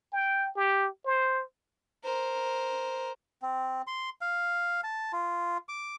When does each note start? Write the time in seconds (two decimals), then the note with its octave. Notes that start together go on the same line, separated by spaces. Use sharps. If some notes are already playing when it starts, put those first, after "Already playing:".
0.13 G5
0.56 G4
1.05 C5
2.04 A#4 C5
3.42 C4
3.87 C6
4.21 F5
4.84 A5
5.13 F4
5.69 D6